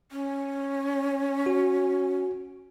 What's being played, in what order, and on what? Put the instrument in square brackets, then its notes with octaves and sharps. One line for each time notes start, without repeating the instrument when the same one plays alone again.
[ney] C#4
[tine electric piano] F#4